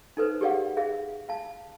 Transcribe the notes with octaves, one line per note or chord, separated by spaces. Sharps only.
D#4 A4 B4 C5
G4 G#4 D5 F5 F#5
G#4 E5 F5
F5 A5